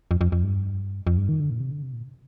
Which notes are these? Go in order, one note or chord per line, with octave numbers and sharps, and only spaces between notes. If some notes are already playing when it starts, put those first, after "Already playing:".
F2
F2
F2
G2
F2
G2
D#3
D3
A#2
C3
D3
C3
A#2